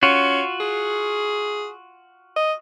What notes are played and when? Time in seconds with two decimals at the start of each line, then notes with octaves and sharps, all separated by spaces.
0.03 C#4 F4 F#4
0.60 G#4
2.36 D#5